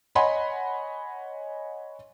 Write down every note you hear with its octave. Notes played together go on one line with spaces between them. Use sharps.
C#5 D#5 F#5 G#5 B5 C6